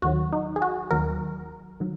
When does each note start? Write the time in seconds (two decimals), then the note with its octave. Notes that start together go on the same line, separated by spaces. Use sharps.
0.02 D#2 D#3 F#3 F#4
0.32 D#4
0.56 G#4
0.62 F#4
0.91 D#2 D#3 F#3 A#4
1.80 D#3 F#3